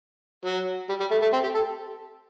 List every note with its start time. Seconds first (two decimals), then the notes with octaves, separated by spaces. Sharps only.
0.45 F#3
0.89 G3
1.00 G3
1.11 A3
1.22 A3
1.33 C4
1.43 G4
1.54 A4